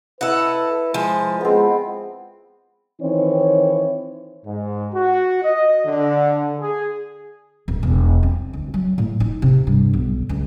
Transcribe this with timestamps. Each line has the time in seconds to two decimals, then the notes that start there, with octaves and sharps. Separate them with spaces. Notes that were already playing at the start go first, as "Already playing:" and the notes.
0.21 E4 A4 B4 D#5 F#5
0.94 F3 G#3
1.41 F2 G#3 B3 C4
3.01 D#3 E3 C4 D#4 C#5
4.46 G#2
4.93 F#4
5.43 D#5
5.85 D3
6.60 G#4
7.68 D1
7.83 E1
8.23 C4
8.53 D2
8.74 F#3
8.98 A2
9.20 D#4
9.42 C3
9.67 G2
9.94 B1
10.29 C#2